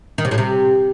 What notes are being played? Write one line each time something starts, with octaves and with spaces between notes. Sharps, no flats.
D#3
C3
A2
C3